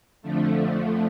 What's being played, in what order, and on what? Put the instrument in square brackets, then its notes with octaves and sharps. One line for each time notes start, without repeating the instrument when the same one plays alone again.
[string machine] F2 D3 F3 A3